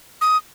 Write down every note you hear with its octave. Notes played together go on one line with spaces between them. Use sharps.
D#6